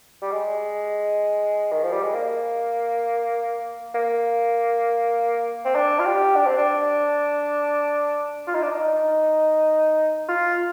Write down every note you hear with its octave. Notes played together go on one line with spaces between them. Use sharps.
G3
G#3
D#3
F3
G3
G#3
A#3
A#3
C4
D4
F4
G4
D4
C4
D4
F4
D#4
D4
D#4
F4